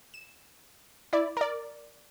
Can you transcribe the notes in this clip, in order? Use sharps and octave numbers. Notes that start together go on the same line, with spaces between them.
E7
E4 D5
A#4 D5